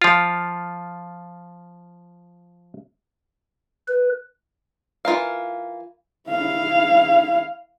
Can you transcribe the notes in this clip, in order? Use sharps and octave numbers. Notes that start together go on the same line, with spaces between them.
F3 F4
B4
E3 F4 A#4 F5
E4 F5